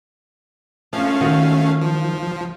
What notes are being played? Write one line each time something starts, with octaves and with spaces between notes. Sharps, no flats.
F3 A3 C#4 F5
D#3 F4 F#4
F3